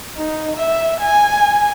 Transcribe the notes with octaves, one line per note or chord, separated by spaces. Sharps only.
D#4
E5
G#5